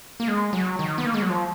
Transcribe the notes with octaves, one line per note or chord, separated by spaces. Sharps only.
A#3
G#3
F#3
D#3
B3
A#3
G#3
F#3
F3